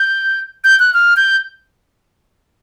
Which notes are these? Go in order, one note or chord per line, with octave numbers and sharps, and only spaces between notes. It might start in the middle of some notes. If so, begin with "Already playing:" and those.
Already playing: G6
G6
F#6
F6
G6